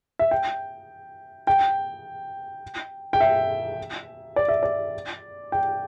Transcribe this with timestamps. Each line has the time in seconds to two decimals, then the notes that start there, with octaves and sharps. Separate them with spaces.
0.19 E5
0.31 G5
1.47 G5
3.13 G5
3.20 E5
4.36 D5
4.48 E5
4.63 D5
5.52 G5